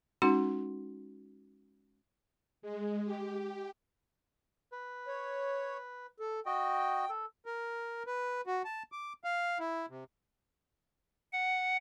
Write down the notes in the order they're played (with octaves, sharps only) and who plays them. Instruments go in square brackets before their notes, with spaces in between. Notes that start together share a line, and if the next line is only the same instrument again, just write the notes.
[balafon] G#3 C#4 D#4 F#4 C6
[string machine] G#3
G4
[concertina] B4
[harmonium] C#5
A4
[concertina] F#4 D#5 [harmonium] G5
[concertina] A4
[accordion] A#4
B4
F#4
A5
D6
F5
E4
C3
[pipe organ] F#5